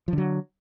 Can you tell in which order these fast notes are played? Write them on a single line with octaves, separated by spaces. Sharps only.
F3 D3 F#3